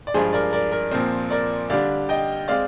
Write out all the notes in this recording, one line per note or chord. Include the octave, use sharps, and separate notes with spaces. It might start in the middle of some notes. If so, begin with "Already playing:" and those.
D5
G2 F3 G#3 D4 G#4 C5
A#4 D5
A#4 D5
A#4
A#2 F3 C4 A#4
A#4 D5
D3 G3 D4 D5 F5
D#5 G5
G#3 C4 D5 F5